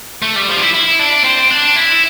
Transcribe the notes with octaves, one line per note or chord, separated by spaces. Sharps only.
A3
G3
F3
D4
E4
E4
D4
C4
D4
E4